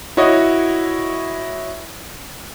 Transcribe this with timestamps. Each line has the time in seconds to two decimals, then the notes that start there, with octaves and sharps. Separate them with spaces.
0.17 E4 F#4 C#5 D#5